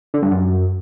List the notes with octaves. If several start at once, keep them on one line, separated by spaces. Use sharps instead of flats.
D3
G2
F#2